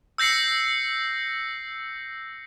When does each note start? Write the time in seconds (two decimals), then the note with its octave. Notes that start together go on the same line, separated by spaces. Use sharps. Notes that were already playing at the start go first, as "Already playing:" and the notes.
0.18 E6 G6 A#6 C7 C#7